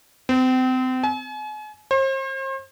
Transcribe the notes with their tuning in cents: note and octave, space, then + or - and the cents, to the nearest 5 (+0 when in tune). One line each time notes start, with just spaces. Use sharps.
C4 -35
G#5 +40
C5 +40